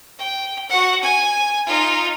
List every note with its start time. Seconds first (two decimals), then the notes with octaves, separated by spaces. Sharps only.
0.19 G5
0.69 F#4 F#5
1.03 G#5
1.66 D#4 F4